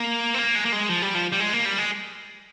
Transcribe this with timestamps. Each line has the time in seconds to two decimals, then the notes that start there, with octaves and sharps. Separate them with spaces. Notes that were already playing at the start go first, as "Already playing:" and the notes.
Already playing: A#3
0.34 C4
0.39 A#3
0.55 G#3
0.65 A#3
0.72 G#3
0.90 F3
1.02 G3
1.15 F3
1.32 G3
1.40 G#3
1.53 A#3
1.65 G3
1.78 G#3